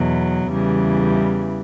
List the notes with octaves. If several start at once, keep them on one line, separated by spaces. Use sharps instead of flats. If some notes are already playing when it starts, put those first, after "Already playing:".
Already playing: E2 B2 F#3
E2 C#3 E3 G3